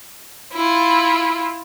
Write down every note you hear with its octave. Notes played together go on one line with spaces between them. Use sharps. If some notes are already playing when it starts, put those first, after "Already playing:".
E4 F4